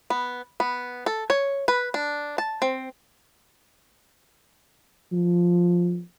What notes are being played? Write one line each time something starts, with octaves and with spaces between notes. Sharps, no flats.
B3
B3
A4
C#5
B4
D4
A5
C4
F3